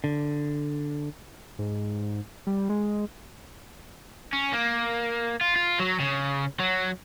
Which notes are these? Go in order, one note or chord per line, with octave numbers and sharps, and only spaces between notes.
D3
G#2
G3
G#3
C#4
A#3
F4
F4
F#3
C#3
F#3